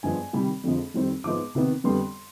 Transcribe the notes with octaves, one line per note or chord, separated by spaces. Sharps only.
G2 F3 G#3 B3 G#5
C3 D#3 G3 B5
F2 D3 F3 G#3
F2 D#3 G3 C4
G#2 F3 G#3 B3 D6
C3 D#3 B3
F2 D3 G3 B3 C6